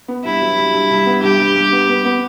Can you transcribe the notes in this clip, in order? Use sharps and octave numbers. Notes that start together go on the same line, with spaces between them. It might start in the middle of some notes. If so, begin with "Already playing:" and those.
B3
G2 E4
F#3
G2
G2
G2
B3
G2 G4
G2
G2
B3
B3
B3